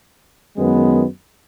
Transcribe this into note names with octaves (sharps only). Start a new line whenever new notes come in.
F#2 D#3 G#3 B3